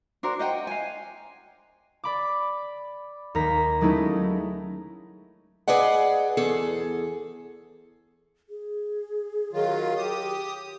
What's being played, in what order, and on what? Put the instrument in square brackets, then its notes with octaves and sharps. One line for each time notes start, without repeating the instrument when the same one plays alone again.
[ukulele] D4 F#4 A#4 C5
C5 D#5 F#5 G5
F5 G#5
[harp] D5 B5 D6
D#2 A#4 A#5 B6
F#3 G#3 A3 C#4 D#4 E4
[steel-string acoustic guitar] G#4 B4 D5 D#5 F#5
E2 G#4 A4
[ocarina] G#4
[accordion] D#3 F#3 F4
G4 D#6